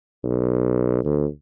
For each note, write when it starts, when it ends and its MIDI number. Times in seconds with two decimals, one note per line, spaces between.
0.24 1.03 35
1.05 1.26 38